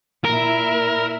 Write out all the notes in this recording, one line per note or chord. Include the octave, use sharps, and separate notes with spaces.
A#2 E4 A#4